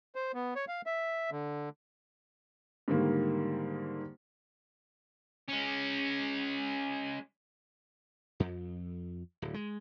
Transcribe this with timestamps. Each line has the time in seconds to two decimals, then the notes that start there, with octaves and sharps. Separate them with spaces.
0.15 C5
0.34 B3
0.56 C#5
0.68 F5
0.86 E5
1.31 D3
2.88 G#2 D3 D#3 G3 A#3
5.48 G#3 C#4
8.40 F2
9.42 D1
9.54 G#3